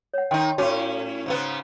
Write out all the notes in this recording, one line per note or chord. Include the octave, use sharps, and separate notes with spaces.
C#5 F#5
D#3 D#4 G5 C6
A2 C#4 F#4 C#5 D6
G#2 C#3 B3